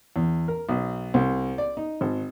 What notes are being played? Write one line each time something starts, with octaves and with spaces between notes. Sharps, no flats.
E2
A#4
B1
C2
D5
D#4
G#1